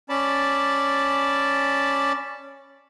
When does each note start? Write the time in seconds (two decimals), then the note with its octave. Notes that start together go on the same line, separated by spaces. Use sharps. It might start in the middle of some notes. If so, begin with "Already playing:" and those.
0.09 C#4 D5 A5 B5